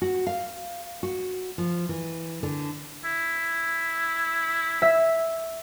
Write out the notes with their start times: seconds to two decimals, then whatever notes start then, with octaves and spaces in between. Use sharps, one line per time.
0.02 F#4
0.27 F5
1.03 F#4
1.58 F3
1.89 E3
2.43 D3
3.05 E4
4.82 E5